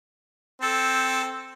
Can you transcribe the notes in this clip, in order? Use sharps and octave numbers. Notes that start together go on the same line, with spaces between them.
C4 A4